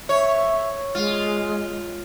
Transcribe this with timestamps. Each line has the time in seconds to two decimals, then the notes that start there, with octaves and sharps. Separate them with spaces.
0.09 C#5 E5
0.95 G#3 F4